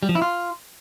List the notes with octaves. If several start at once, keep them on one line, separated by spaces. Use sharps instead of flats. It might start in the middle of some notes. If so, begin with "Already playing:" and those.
G3
F3
E4
F4